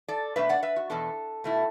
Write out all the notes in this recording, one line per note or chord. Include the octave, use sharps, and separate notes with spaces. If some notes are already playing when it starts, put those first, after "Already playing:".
A4 D5
B2 A3 D4 B4 E5
D5 F#5
B4 E5
F#4
E2 B2 B3 D4 A4
B2 A3 E4